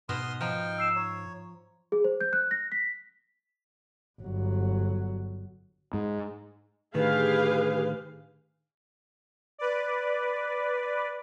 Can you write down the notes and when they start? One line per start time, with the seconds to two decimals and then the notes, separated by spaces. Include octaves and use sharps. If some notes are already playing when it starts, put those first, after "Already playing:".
0.09 G#2 B2 C6 D#6 F6
0.41 F3 D#4 G5 F6
0.78 E6 C7 E7
0.96 C#5 A#5
1.92 G#4
2.04 C5
2.21 G6
2.33 F#6
2.51 A#6
2.72 B6
4.21 G1 F#3
5.93 G#2
6.94 A2 D3 D#3 G4 G#4 B4 F5
9.58 B4 D5